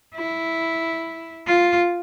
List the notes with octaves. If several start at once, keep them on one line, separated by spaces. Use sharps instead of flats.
E4
F4